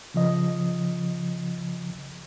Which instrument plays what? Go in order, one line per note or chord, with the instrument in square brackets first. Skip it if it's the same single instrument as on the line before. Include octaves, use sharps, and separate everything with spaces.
[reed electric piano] C#3 F3 D#5